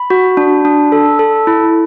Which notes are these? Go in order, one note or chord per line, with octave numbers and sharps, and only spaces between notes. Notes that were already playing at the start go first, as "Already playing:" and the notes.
Already playing: B5
F#4
D4
D4
A4
A4
E4